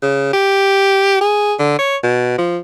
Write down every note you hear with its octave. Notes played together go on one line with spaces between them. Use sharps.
C#3
G4
G#4
D3
C#5
B2
F3